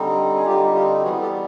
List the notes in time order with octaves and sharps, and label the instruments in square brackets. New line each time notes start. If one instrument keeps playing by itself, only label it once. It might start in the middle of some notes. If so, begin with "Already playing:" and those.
Already playing: [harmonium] D3 G3 C4 D#4
G#4
D3 G3 C4 D#4 F4 G4
F4 G4
E3 G3 B3 F#4 G#4
G4 A4